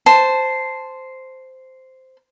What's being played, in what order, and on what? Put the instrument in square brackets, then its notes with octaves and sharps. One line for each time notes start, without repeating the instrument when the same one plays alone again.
[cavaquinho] C5 A5